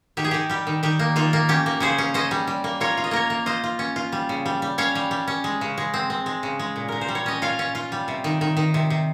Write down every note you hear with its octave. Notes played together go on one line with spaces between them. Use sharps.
D#3 G4
G#4
D#3 G4
G3 G4
D#3
D#3 G4
A#3
D#3 F4
A#3
C#4 G4
A#3
C#3 G#4 C5
C#4
C#4 C5 D#5
G3
G3
A#3
F4 A#4 C#5
F4
D#5
A#3 A#4 C#5
A#3
F4 C5 D#5
F4
C#4
F4
G3
C#3
G3
G3
C#4 C#5 F5
G3
G3
C#4
G#3
C#3
G#3
C4
C4
G#3
C#3
G#3
A#2
A#2 A#4
C5
G3
C#5
C#4 D#5
F4 C#5 F5
C#4
F4
G3
C3
D#3
D#3
D#3
C3
C3